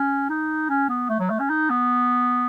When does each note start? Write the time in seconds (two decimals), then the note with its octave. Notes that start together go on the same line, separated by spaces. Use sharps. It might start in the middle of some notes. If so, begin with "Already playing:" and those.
Already playing: C#4
0.30 D#4
0.70 C#4
0.89 B3
1.09 A3
1.20 F#3
1.30 A3
1.40 C#4
1.50 D#4
1.70 B3